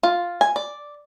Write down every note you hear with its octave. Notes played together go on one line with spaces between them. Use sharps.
F4
G#5
D5